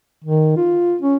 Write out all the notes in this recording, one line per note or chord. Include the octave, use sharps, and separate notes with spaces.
D#3
F4
C#4